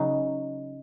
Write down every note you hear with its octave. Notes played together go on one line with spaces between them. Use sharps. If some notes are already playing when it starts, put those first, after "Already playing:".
Already playing: C#3 F#3 D#4